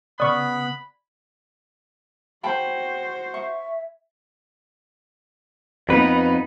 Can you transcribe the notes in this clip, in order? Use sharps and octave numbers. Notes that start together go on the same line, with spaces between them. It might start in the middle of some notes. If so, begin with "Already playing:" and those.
C#3 B3 D5 B5 C#6 D#6 F6
F#4 C5 G5 A5 B5
E5 C#6
F2 B3 D#4 B4 B5